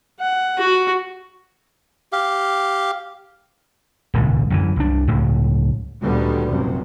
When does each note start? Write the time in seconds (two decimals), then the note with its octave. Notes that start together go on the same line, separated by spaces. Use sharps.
0.21 F#5
0.58 F#4
2.12 G4 F5
4.14 D#1 C#2 G#2
4.50 F#2 D3 E3
4.76 C2 D4
5.08 C#2 A2
6.02 D2 A#2 D3 D#3 G3 B3
6.50 F1 A#1 F#2 C3